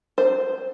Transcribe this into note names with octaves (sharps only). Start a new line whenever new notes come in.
C5